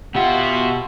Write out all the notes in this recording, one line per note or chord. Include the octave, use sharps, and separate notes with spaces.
B2 F4 G4 E5 F#5